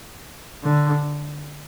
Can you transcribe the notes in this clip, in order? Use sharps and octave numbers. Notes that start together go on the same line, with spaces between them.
D3